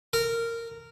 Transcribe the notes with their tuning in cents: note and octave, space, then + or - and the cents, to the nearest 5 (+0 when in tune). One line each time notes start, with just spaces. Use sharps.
A#4 -15